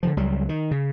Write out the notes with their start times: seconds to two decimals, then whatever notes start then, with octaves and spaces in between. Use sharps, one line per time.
0.03 D3 D#3 F3
0.17 C#2 F#3 G3
0.49 D#3
0.71 C#3